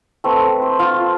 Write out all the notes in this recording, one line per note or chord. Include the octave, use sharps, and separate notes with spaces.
A3 C4 B4
C5
F4